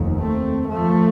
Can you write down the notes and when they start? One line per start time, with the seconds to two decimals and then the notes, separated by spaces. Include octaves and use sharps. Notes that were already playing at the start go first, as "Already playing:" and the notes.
Already playing: F1 D#2
0.17 A3 C4
0.67 F3 A3